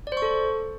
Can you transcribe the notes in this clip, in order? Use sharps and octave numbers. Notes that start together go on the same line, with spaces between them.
D5
C5
C#6
A4